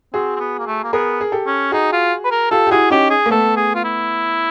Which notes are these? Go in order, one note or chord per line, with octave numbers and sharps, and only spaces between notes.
C4 F#4 G#4
C4
B3
A#3
A3
A#3
B3 G#4 A#4
G#4
G4 A4
C#4
D#4 F#4 G#4
F4
B4
A#4
F4 G4 A4
G4
E4 F#4 G#4
C#4 D#4 G4
G#4
A#3
A3 B3 A4
G#4
F4
E4